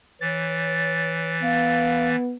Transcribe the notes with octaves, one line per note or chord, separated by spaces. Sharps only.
E3 C#5 A6
B3 F5